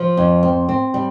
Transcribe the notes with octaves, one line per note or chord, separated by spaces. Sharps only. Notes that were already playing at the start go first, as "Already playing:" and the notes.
Already playing: F3
F2
C4
C4
G3